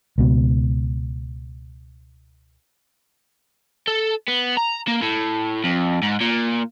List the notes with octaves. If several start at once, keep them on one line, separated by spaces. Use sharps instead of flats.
C#2 B2
A4
B3
A#5
A#3
A2
F2
G#2
A#2